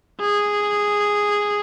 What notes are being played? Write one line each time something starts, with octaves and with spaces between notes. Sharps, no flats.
G#4